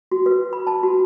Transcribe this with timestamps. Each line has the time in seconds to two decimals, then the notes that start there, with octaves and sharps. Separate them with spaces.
0.12 F#4
0.26 B4
0.53 B5
0.67 A5
0.83 F#4